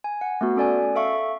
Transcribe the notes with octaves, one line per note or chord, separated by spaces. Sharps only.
G#5
F#5
A3 B3 F#4
C#4 A4 D5 G#5
A4 E5 F5 C#6